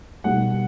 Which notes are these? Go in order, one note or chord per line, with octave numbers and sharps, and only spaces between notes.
B2 G3 A#3 D#4 F#5